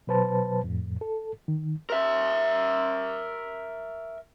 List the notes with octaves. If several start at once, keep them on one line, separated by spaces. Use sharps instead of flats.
B2 F#3 B4 C5 A5
F2 A2
A4
D#3
A#4 E5